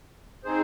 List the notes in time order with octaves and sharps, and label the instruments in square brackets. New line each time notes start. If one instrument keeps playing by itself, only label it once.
[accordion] C4 D#4 G#4 C5